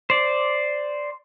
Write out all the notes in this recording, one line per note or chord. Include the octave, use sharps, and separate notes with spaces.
C5 D5